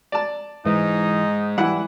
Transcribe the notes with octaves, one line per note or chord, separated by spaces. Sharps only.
D5 A5
G#2 E3 D#4
E3 G3 E4 F#5